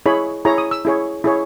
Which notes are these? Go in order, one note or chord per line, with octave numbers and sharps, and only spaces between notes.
E4 G#4 C#5 B5
E4 G#4 C#5 A#5
D#6
E6
E4 G#4 C#5
E4 G#4 C#5